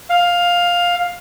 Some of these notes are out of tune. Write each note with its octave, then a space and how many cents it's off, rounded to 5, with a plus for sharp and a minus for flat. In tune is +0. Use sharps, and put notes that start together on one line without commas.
F5 +10